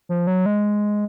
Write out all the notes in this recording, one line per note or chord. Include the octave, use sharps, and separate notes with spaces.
F3
F#3
G#3